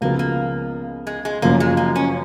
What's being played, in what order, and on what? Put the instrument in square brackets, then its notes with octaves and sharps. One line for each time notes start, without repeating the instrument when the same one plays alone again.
[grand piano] C#2 C#3 F3 B3 [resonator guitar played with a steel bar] A#3
[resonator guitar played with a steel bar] A#3
G#3
G#3
[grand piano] F#1 F#2 F3 [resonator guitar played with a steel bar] A#3
[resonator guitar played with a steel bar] G#3
A#3
C#4